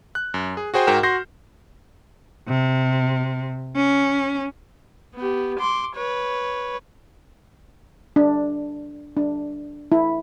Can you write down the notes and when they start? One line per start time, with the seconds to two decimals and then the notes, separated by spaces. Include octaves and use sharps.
0.15 F#6
0.34 F#2
0.57 G#4
0.74 F#4 G#4 C5 G5 G#5
0.87 G#2 F#4 A#4 G5 F6 E7
1.03 F#4 C6 G6 A#6 C7
2.49 C3
3.77 C#4
5.15 B3 G4
5.59 C6 D6
5.96 B4 C#5
8.16 D4
9.17 D4
9.92 E4